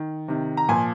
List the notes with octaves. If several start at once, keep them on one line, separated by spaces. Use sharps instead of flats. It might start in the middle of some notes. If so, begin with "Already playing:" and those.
Already playing: D#3
C3 D#3
A#5
A#2 F3 G#5